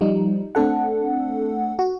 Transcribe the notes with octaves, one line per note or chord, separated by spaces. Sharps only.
F3 G3 D#4
A3 C4 D4 A4 F#5
F#4